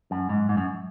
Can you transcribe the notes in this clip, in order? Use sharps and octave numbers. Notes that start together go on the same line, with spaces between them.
F#2
G#2
G#2
F#2